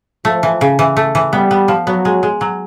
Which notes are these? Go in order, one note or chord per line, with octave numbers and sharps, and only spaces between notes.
F3 A3
E3
C#3
E3
A3
E3
G3 B3
B3
F3
F#3 B3
G#3
G#3
F#3